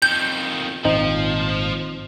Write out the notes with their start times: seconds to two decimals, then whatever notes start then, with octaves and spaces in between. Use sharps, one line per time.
0.02 F2 D#3 G6
0.85 G#1 A#2 F3 C4 D#4